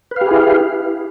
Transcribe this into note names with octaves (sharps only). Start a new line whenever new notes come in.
E4 G4 G#4 B4 F5